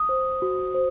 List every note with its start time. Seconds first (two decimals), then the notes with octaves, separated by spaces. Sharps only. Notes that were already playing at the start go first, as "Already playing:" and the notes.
Already playing: D#6
0.09 C5
0.42 F#4
0.75 C5